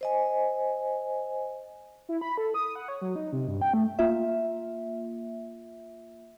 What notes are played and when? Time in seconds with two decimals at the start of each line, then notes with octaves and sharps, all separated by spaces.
0.01 C5 D#5 G#5
2.09 E4
2.21 B5
2.38 A4
2.54 D#6
2.75 F#5
2.88 C#5
3.01 F#3
3.16 D#4
3.33 C3
3.48 G2
3.61 G5
3.74 A3
3.99 A#3 F4 E5